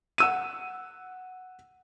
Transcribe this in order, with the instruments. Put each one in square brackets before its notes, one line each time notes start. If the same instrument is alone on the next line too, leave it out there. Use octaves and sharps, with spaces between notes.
[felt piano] F#5 E6 D#7